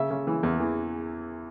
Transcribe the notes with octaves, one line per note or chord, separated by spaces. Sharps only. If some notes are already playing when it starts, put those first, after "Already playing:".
Already playing: C#3 E5
C#3
E3
E2
E3